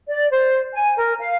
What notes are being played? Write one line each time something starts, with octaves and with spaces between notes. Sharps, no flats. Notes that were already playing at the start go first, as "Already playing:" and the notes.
D5
C5
G#5
A#4
F5